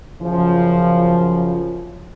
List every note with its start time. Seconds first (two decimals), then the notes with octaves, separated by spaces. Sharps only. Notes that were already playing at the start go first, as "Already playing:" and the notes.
0.21 F#2 C#3 F3